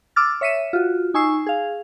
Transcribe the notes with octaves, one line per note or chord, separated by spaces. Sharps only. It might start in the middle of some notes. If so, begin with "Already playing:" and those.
D6 E6 F6 A6
C#5 E5 B6 C#7 D#7 E7
F4 F#4
D#4 G#5 C#6 E6 C7
G#4 F5